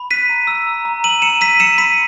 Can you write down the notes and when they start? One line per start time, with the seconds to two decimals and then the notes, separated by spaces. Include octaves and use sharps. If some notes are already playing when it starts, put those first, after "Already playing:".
Already playing: B5
0.11 F#6 B6 D#7
0.30 A#5
0.47 E6
0.66 A#5
0.85 A#5
1.04 E6 D#7 F#7
1.22 A#5 C#7 E7
1.41 E6 B6 D#7
1.60 E6 C#7 E7
1.78 B5 B6 D#7